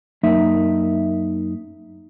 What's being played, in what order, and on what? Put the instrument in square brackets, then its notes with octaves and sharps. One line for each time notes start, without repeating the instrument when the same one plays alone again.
[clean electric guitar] F#2 A#3 D#4 E5